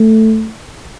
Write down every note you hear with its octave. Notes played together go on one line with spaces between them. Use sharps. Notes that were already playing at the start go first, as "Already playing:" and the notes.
Already playing: A3